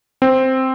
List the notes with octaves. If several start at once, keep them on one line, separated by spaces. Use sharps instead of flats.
C4